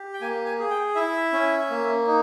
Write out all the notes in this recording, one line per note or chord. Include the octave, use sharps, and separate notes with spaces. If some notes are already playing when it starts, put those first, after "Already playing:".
Already playing: G4
G5
A#3 G#5
G#5
G#4
G5
E4 E5
C#4
A#3
D#4